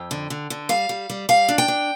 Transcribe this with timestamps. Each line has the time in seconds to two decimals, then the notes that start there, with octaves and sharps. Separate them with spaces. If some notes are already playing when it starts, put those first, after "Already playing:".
Already playing: F2 G5
0.11 D3
0.30 D3
0.50 D3
0.69 G3 F5
0.89 G3
1.10 G3
1.29 G3 F5
1.49 D4
1.58 G5
1.68 D4